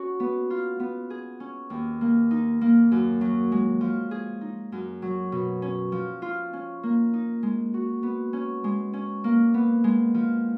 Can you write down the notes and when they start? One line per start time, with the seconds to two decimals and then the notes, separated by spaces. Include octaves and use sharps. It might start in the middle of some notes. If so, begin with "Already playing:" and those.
Already playing: C#4 F#4
0.20 B3
0.50 F4
0.80 B3
1.10 G#4
1.40 C#4
1.70 D#2
2.01 A#3
2.31 D#4
2.61 A#3
2.92 F#2
3.21 F#3
3.52 G#3
3.81 F3
4.11 G#4
4.41 D#4
4.72 F#2
5.02 F#3
5.32 B2
5.62 C#4
5.92 F3
6.22 F4
6.53 C#4
6.83 A#3
7.13 D#4
7.43 G#3
7.74 F#4
8.03 B3
8.33 C#4
8.64 G#3
8.93 C#4
9.24 A#3
9.54 B3
9.84 G#3
10.15 F3